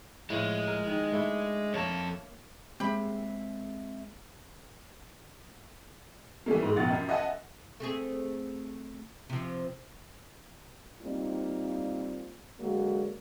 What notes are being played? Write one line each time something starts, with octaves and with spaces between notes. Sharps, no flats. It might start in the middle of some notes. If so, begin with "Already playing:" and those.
A2 F3 G#3 F5
A#4
D#3
A3 D4 E4
F2 A#3 A4 C#5
G#3 A#3 C4 G4 C5 E5 B5
E3 G3 A3 A#3
G#2 G#3
F1 A#1 B2 F#5 A6
F#2
D#5 E5 F#5 G#5 A5
A3 C4 G#4
C3 F3
G3 A#3 C4 D#4 F4
D3 F#3 G#3 A#3